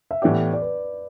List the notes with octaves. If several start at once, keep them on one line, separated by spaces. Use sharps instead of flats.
E5
A2 E3 B3 G4 D5
D5
B4